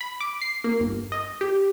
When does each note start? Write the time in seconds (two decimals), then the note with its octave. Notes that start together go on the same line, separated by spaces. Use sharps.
0.01 B5
0.20 D6
0.42 C7
0.64 A#3
0.80 G1
1.12 D#5
1.41 G4